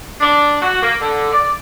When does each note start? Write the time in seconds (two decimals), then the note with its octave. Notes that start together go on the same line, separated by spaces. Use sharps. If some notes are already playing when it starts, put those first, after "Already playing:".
0.20 D4
0.62 F#4
0.82 A#3
1.00 D3
1.33 D5